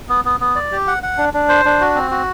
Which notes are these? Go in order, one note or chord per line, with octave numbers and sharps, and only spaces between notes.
B3
B3
B3
D5
G4
F#5
F#5
D4
D4
C5
D4
F#4
C4
F#4